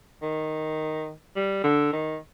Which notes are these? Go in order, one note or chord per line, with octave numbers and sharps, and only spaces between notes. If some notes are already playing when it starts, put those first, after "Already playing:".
D#3
G3
D3
D#3